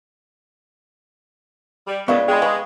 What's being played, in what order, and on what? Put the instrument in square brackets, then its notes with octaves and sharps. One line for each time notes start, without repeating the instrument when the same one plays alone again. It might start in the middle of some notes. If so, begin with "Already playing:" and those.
[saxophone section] G3
[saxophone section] C#3 G#3 [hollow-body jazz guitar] B3 D4 F4 [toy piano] A#4 F5 C#6
[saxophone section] G#3 [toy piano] G5 B5
[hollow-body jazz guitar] B4 [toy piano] F5 G#5 C#6